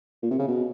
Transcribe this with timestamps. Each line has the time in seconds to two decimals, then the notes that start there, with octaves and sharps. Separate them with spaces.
0.23 A#2
0.31 C3
0.39 C#3
0.48 B2